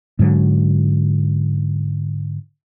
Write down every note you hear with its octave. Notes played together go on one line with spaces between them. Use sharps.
G#2 D3 F#3